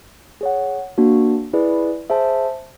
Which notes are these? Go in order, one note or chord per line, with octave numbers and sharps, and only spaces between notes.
G#4 C#5 F#5
A#3 D4 F#4
E4 G#4 B4 D5
G#4 C5 E5 A5